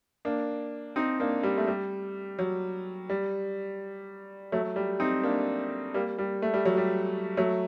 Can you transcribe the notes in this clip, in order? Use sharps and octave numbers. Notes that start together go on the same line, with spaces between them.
A#3 D4
C4 D#4
A#3 D4
G3
A3
G3
F#3
G3
F#3 A3
G3
C4 D#4
A#3 D4
G3 A#3
G3
A3
G3
F#3
G3
F#3 A3